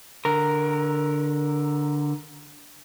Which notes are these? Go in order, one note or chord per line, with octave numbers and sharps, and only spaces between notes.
D3 A#4